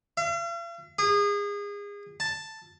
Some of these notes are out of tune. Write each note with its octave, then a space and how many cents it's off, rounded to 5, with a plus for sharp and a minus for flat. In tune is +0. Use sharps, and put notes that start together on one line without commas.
F5 -45
G#4 -30
A5 +5